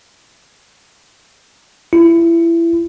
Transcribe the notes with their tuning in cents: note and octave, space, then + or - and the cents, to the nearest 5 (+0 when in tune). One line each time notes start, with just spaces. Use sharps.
E4 +25